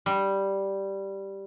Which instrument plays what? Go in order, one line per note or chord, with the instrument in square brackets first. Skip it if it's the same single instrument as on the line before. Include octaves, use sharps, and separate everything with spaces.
[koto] G3